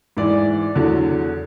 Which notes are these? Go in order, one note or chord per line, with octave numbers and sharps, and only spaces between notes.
G#2 E3 D5
E2 D3 F#3